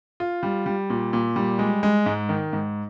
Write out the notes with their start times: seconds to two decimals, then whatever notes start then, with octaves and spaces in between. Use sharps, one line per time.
0.20 F4
0.43 G3
0.66 G3
0.90 A#2
1.13 A#2
1.36 G3
1.59 G#3
1.83 G#3
2.06 G#2
2.29 D#3
2.53 G#2